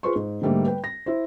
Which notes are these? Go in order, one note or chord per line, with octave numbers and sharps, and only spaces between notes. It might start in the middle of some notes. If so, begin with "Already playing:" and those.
F4 G#4 B4 C5 C6 C#6
G#2
G#2 D3 G3 A3 A#3
B4 G5
A#6
E4 C5